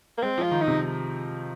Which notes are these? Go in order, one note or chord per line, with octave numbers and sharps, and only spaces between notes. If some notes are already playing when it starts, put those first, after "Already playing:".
A#3
G#3 C4
F3
F4
D#3
D#4
C3